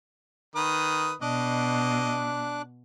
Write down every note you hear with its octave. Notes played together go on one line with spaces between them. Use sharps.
D#3 B4 D#6
B2 D4 D#5 D6 F#6